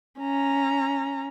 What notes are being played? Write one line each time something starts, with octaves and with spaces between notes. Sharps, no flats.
C#4 A#5